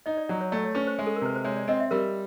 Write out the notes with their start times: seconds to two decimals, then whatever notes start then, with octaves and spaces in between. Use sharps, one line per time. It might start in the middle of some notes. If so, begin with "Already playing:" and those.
0.06 D#4 D#5
0.17 D5
0.29 F#3 D5
0.41 C#5
0.52 A3 D5
0.64 C#5
0.75 C#4 B4
0.87 C5
0.99 G#3
1.07 A4
1.16 A#4
1.21 C3 B4
1.35 C5
1.44 G#3 C#5
1.57 D5
1.68 C4 D#5
1.80 E5
1.91 G3 A#4